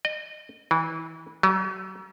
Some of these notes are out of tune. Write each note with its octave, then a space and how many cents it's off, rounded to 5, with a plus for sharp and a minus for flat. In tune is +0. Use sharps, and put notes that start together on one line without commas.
D#5 -30
E3 -25
F#3 +40